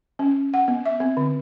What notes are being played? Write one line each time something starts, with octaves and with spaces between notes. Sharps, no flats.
C#4
F#5
B3
E5
C4
D3